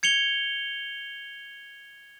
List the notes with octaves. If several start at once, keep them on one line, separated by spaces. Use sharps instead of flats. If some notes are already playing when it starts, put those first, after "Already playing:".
G#6 C#7 F7 G7